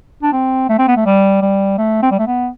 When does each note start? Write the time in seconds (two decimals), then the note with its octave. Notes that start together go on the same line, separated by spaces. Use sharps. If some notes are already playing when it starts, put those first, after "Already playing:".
0.22 D4
0.33 C4
0.69 A3
0.78 C4
0.88 B3
0.97 A3
1.06 G3
1.42 G3
1.78 A3
2.03 C4
2.11 G3
2.19 A3
2.27 B3